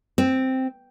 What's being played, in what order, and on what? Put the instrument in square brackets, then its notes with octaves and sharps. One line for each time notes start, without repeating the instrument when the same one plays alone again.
[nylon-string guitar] C4